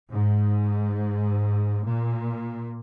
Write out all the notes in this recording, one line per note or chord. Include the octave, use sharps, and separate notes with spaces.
G#2
A#2